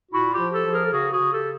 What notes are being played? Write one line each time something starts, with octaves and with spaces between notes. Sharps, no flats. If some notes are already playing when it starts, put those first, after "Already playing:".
A#2 E4 F#4
F4 G4
F3
G4 A4
F3
G#4 A#4
A4
C#3 F#4 G#4
F#4 G#4
C#3
G4 A4